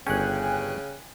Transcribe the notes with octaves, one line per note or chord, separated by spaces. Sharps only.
G1 C#3 C#4 G5 G#5 F#6